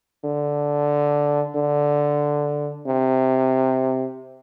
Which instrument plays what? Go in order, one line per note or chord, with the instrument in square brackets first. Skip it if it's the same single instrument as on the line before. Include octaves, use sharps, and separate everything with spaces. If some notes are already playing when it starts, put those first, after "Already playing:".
[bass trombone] D3
D3
C3